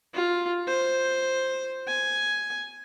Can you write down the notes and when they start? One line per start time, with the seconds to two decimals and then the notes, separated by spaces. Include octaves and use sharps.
0.14 F4
0.68 C5
1.88 G#5